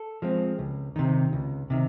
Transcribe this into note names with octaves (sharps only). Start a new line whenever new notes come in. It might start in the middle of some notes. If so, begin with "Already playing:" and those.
Already playing: A4
F3 G#3 C4
C#2
C3 D#3
C#2
C3 D#3